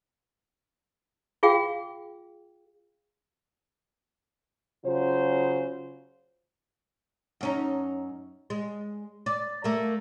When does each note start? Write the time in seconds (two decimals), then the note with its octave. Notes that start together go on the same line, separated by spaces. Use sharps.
1.43 F4 G#4 F5 G5
4.84 C#3 F#3 F4 C5
7.41 F#2 C#4 D#4
8.50 G#3
9.26 D5
9.64 A3 A#3